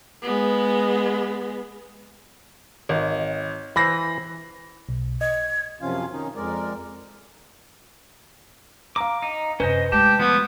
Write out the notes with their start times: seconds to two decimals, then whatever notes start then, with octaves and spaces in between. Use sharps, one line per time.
0.22 G#3 B3
2.89 G#1 C#5 D#5
3.76 E3 C5 B5 A#6
4.89 B1
5.21 D#5 G#6
5.81 F#2 C3 F3 C#4 F4 F5
6.12 D#3 C#4 D#4
6.36 F2 G#3 A#4 D5
8.96 F5 A#5 D6
9.23 D#4
9.60 F#2 C3 C#4 B4 C5 D#5
9.92 G#3 A3 G4 A5
10.19 F3 G3 B3